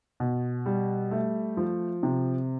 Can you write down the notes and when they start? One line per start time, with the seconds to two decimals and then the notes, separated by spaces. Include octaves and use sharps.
0.20 B2
0.66 G3
1.11 A3
1.57 F3
2.03 C3